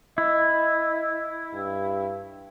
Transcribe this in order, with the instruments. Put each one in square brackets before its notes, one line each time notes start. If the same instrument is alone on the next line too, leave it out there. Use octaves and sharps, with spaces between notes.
[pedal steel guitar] E4 [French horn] D#5
[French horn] G2